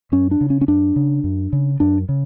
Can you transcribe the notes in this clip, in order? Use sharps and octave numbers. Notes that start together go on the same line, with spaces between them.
F#2 C#4
D4
C#3
C#4
C#4
F#2 D4
C#3
F#2
C#3
F#2 D4
C#3